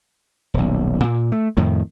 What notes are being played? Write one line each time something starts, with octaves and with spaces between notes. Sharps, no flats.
D#1 B1
A#2
A3
F2 A2 D#3